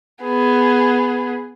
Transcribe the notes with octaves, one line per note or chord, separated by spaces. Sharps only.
B3 G#4